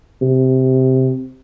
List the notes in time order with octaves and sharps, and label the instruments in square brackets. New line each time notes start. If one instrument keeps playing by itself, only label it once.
[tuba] C3